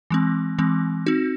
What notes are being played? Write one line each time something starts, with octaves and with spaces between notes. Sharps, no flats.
E3 G#3 C4
E3 G#3 C4
C4 D#4 F#4